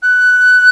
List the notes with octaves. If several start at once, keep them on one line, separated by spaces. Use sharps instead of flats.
F#6